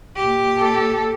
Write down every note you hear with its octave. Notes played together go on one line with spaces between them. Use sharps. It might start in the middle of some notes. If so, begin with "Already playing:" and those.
A#2 G4
A4